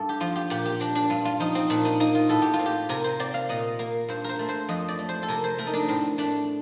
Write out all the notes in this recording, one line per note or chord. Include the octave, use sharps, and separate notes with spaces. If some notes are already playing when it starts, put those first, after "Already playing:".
Already playing: G2 A4
G4
F3 F4
G4
A#2 G4
G4
C4 D4
D4
G2 F4
F4
F3 D#4
C4
A#2 D4
D#4
A#3 D#4
F4
A2 A4
G4
F4
C4
G4
C3 A#4
C5
C4 D5
F5
A#2 D#5
A#3
G2 C5
A#4 C5
A3
C5
F2 D#5
D5
A3
C5
A4
C3 A#4
C5
A3 A#4
D#4
D4
A2 C4
A3 D4